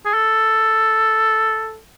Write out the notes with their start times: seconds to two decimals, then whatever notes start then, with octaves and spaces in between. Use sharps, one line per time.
0.05 G#4
0.14 A4